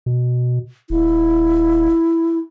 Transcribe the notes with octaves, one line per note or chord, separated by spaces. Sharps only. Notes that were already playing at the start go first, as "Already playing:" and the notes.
B2
D#1 E4